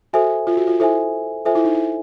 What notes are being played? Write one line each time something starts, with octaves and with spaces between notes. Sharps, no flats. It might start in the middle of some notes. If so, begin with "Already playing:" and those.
F#4 A4 C5 E5 G#5
F4
F#4
F4
E4 A4 C5 E5 G#5
F4 A4 C5 E5 G#5
E4
D#4
E4